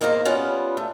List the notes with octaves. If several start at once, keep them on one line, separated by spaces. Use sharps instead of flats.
E2 A#3 D#4 C5 F5 A#5
G3 B3 C#4 F4 F#5
A3